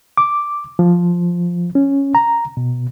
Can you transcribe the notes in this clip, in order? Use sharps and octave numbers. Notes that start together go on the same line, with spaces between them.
D6
F3
C#4
A#5
B2